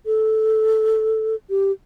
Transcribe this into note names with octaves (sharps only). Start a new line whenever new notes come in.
A4
G4